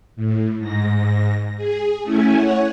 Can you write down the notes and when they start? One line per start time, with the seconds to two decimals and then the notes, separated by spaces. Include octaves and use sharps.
0.16 A2
0.59 G#2 A#6
1.57 G#4
2.03 A3 C#4 E4 G#5
2.36 C#5 F#5